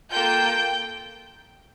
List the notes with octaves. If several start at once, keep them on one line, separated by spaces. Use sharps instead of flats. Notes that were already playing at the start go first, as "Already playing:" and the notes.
A#3 F4 A4 G5 G6